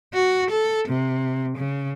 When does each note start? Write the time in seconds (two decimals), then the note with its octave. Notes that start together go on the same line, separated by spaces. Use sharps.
0.14 F#4
0.51 A4
0.89 C3
1.58 C#3